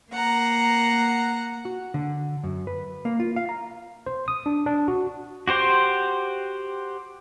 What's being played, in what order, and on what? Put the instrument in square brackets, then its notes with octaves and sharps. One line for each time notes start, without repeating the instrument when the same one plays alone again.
[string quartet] A#3 F#5 A#5
[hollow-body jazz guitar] F#4
D3
F#2
B4
A#3
F4
F5
A#5
[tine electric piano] C5
D#6
D4
D4
F#4
[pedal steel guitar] F#4 G4 C5